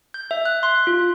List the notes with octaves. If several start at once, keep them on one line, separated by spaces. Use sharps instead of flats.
G6
E5
F#6
C6
F4